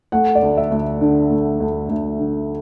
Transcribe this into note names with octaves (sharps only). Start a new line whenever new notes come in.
A3 F#5
D5
D2
E5
D2
D3
A3
D2
D2
D3